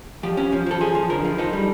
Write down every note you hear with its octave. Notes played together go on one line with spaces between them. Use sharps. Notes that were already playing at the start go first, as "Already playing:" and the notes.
F3 G4
C#4
F3
F3 A4
F3 G#4
F3
D3 A#4
F3
D#4 A4
G3